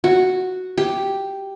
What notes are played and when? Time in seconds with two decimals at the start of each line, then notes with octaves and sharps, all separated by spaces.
0.04 F#4
0.78 G4